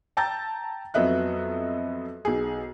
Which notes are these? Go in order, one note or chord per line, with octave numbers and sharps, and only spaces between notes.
G5 A5 A#5 E6 G6 A6
F2 F#3 B3 D#5 E5 F#6
B1 G#4